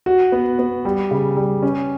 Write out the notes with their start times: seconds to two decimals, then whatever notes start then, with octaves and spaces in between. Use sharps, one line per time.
0.06 F#4
0.32 B3
0.59 B3
0.85 G3
1.11 C#3
1.37 G3
1.63 C#4